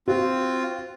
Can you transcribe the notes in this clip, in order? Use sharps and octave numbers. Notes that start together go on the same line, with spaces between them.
C4 F4 F#4